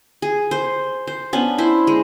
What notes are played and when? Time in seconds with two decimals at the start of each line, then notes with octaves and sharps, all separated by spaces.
0.22 G#4
0.51 C5
1.07 C5
1.33 B3 C#4 D4
1.58 E4 C5
1.87 G#3